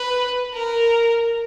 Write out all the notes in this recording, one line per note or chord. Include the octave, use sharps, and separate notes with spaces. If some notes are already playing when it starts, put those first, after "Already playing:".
Already playing: B4
A#4